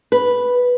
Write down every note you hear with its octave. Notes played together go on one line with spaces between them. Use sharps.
B4